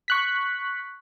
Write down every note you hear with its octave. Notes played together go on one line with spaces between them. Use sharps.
C#6 F#6 B6